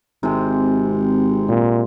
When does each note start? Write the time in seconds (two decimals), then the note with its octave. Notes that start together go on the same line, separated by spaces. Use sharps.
0.23 G#1 C3 G#3
1.49 A#2